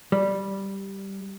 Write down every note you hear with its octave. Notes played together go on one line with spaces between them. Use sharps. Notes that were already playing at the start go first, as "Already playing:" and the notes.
G3